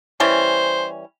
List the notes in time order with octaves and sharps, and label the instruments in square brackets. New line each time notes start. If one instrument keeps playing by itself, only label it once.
[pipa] E3 G3 C#4 [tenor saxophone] C5